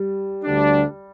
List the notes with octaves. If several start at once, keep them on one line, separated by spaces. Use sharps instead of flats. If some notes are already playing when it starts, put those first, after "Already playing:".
Already playing: G3
D2 D3 G3 D4